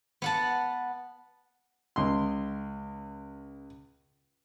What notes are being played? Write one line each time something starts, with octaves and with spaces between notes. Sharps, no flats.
B3 F#5 A5
C#2 C6